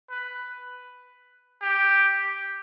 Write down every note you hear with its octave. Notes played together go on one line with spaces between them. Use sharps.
B4
G4